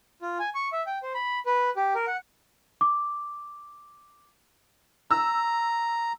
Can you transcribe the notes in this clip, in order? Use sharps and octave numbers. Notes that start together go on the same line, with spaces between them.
F4
G#5
C#6
E5
G5
C5
B5
B4
G4
A#4
F#5
D6
A#5 E6